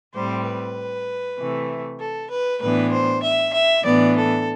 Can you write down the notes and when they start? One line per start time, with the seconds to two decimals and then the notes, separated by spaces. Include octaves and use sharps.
0.14 A2 G3 C4 C5
0.46 B4
1.38 C3 E3 A3
2.00 A4
2.31 B4
2.62 A2 E3 B3 D4 B4
2.92 C5
3.23 E5
3.54 E5
3.85 A2 E3 B3 D4 D5
4.16 A4